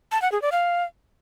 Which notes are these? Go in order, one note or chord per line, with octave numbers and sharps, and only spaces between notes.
A5
F#5
G#4
D5
F5